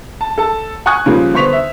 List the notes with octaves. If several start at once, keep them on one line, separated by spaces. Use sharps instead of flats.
A5
A4 A5
F#5 G#5 C#6 D#6 F#6 G#6
C#3 F3 G3 A#3
D3 B3 C5 C#6 B6 F7
E5